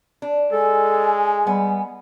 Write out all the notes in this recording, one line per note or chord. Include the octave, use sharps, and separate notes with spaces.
D4
G#3 A4 G#5
G3 B3